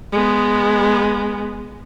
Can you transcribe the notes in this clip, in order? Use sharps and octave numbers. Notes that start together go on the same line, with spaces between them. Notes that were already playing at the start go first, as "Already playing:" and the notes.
G#3 B3